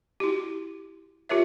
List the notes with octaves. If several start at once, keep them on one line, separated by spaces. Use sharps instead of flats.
E4 F#4 G4
F4 G4 A#4 C#5 E5